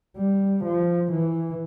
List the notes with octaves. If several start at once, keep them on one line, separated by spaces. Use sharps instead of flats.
G3
F3
E3